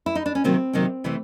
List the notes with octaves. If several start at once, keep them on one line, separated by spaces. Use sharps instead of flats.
E4
D#4
D4
C#4
C3 D#3 F#3 A#3 C4
C3 D#3 F#3 A#3
C3 E3 A3